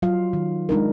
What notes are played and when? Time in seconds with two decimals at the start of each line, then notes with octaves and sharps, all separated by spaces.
0.02 F#3 F4 F5
0.33 D#3
0.69 G#3 D4 D#4 A#4